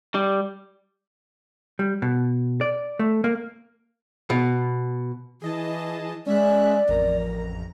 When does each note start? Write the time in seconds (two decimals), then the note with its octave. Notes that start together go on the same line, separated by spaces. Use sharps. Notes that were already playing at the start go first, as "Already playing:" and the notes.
0.15 G3
1.79 G3
2.02 B2
2.61 D5
2.99 A3
3.24 A#3
4.30 B2
5.42 E3 G#4 D#5 A5
6.27 G#3 C#4 D5 E5 F#6
6.89 A1 F2 A#4 A#5